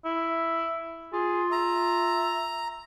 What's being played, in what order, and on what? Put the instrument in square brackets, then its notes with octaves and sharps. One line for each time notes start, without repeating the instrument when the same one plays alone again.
[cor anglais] E4
[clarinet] F4 [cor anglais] G#4
[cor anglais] E5 [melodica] A#5